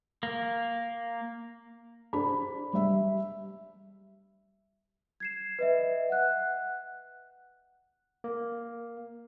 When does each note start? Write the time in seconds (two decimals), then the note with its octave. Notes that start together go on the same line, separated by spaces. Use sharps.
0.23 A#3
2.13 D4 G#4 C5 B5
2.73 G3 E5
5.20 G#6 C7 E7
5.59 B4 D#5 E5
6.09 F#5 F#6
8.24 A#3